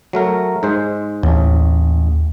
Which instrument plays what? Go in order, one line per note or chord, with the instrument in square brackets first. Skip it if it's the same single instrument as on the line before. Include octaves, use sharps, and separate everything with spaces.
[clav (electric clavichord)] F#3 A3 A#4
G#2 G#3 C5
[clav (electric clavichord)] A1 [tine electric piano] D#2